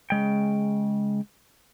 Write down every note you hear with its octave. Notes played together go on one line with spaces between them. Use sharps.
C#3 G#3 G5